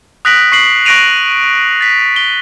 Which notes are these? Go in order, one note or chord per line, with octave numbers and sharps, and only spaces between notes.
D#6 F#6 A#6 B6 D7 F#7
C#6 C7 F#7
C#6 F#6 A#6 D7 D#7 F7
A6 B6
G7